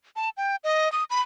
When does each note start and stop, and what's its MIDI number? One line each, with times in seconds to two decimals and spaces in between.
0.16 0.30 81
0.37 0.56 79
0.64 0.91 75
0.92 1.04 87
1.10 1.21 83